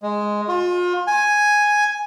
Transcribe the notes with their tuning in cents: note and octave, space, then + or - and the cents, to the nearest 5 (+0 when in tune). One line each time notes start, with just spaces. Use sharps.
G#3 +0
F4 +35
G#5 +0